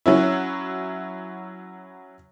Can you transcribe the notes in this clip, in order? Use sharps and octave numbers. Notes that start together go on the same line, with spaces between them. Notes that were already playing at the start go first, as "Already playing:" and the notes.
F#3 C#4 E4